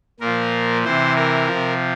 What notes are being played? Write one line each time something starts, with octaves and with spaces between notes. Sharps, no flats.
A#2 F3 A#4
C3 E3 C5
A#4
F3
C3